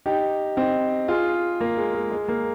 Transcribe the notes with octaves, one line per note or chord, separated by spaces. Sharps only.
D#4 G4
C4 D#4
F4 G#4
A#3
G#3
G#3
G#3
A#3